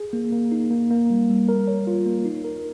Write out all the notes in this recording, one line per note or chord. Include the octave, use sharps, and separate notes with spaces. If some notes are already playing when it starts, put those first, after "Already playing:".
Already playing: G#4
A#3
A#3
D#4
A#3
A#3
G3
G3
A#4
C#5
F4
A#3
D#4
A#4